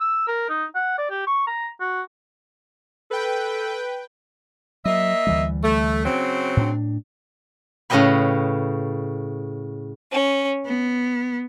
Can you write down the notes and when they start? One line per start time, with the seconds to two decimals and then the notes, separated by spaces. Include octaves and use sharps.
0.01 E6
0.28 A#4
0.49 D#4
0.75 F#5
0.98 D5
1.10 G4
1.27 C#6
1.47 A#5
1.81 F#4
3.11 A4 B4 G5
4.85 F#3 A#3 D#5 E5
5.27 D2 E3 G3
5.63 A3
6.05 C#3 F#3 C4
6.57 A2 D4
7.90 A2 C#3 B4 D#5 G5 B5
10.11 C#4
10.65 B3